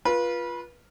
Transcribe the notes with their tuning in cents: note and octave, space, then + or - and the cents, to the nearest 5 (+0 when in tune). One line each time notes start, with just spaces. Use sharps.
F4 +0 B4 -25